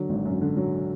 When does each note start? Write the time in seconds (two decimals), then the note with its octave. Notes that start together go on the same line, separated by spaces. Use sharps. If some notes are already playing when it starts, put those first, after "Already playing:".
Already playing: D3 F#3
0.09 G#1
0.25 F#2
0.41 D3
0.57 F#3